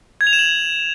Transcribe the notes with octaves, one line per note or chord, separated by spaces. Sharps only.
G#6
F7
E7
F#7